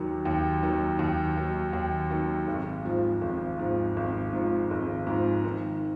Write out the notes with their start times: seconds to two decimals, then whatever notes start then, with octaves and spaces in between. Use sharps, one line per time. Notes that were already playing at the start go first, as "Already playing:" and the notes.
Already playing: D#2 D#3 F#3
0.25 D#2
0.63 D#3 F#3
0.99 D#2
1.37 D#3 F#3
1.73 D#2
2.11 D#3 F#3
2.48 G#1
2.85 G#2 F3
3.21 G#1
3.59 G#2 F3
3.97 G#1
4.33 G#2 F3
4.71 G#1
5.07 G#2 F3
5.45 D#3